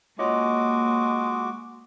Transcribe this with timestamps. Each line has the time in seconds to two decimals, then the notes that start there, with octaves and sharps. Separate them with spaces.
0.19 G#3 A#3 F4 F#4 C#5 D#5 D6